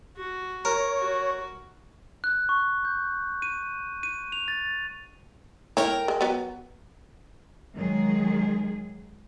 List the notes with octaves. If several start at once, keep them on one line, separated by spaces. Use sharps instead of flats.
F#4
A#4 C#5
F#4
F#6
C#6
G6
D#7
D#7
F7
A6
E4 A#4 C#5 G5
G#3
F#3 B3
D#3 F#3 G#3 G#4